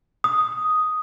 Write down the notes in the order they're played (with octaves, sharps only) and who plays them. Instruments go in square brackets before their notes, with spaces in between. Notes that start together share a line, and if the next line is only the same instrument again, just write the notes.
[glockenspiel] D#6